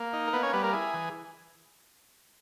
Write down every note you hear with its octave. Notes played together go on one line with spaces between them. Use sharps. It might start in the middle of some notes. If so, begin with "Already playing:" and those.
Already playing: A#3
D#4
A#4
A#3 B3 B4
C#4 C#5
G3 B3 B4
A#3 A#4
E4 G#4
E3